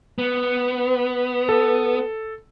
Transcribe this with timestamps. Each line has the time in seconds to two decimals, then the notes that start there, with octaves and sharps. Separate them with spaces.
0.18 B3
1.49 A4